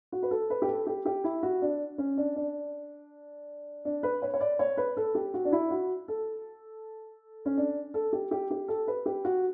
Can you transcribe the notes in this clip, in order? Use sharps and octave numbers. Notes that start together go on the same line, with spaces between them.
F#4
B4
A4
B4
G4
A4
G4
G4
E4
F#4
D4
C#4
D4
D4
D4
B4
C#5
C#5
D5
C#5
B4
A4
G4
F#4
D4
E4
F#4
A4
C#4
D4
A4
G4
G4
G4
A4
B4
G4
F#4